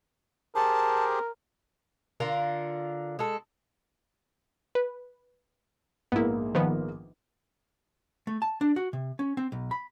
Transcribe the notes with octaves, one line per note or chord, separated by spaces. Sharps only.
G4 G#4 A#4 C5 A5
D3 F4 A#4
G#3 A4
B4
A#1 G#2 A#3 B3 E4
D#3 F3 B3
A3
A5
D4
F#4
C3
C#4
C4
B1
B5